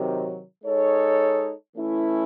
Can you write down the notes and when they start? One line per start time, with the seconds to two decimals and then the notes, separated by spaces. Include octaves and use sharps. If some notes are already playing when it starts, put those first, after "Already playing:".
Already playing: C3 D#3 F#3
0.64 G#3 D#4 A4 C#5
1.76 E3 A3 C#4 E4